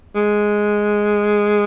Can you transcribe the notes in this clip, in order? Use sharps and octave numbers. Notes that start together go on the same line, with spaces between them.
G#3